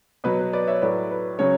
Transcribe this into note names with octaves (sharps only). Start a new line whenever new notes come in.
B2 F#3 B4
B4
B4 D5
C#5 E5
A2 F#3 B4 D5
B4
C#3 F#3 C#5